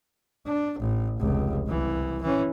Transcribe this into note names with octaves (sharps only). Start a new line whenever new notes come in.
D4
A1
F1 C#2
C2 E3
E3 C#4